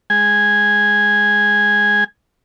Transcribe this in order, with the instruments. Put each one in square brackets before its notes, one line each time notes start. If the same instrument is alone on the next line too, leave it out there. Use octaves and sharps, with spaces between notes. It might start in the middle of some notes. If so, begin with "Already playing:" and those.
[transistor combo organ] G#3 G#5